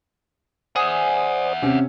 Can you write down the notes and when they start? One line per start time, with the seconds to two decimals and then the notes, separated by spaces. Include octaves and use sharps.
0.76 G#4 C5 D5 E5 F#5 D#6
1.62 C3 C#4